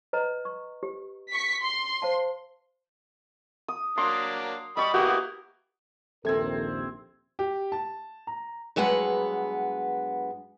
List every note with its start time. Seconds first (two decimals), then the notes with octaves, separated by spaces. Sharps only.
0.13 B4 D#5 A#5
0.45 C#6
0.83 G4
1.31 C#6 B6
1.62 C6
2.02 C5 F5 A5
3.68 D#6
3.98 F#3 A#3 D4 C6
4.77 G3 D#5 B5 C#6
4.94 A#3 B3 E4 F#4 G4 D#6
6.25 A#1 D#2 C3 C4 A4 A#4 G#6
7.39 G4
7.72 A5
8.27 A#5
8.76 G2 F#3 G#3 B3 F#5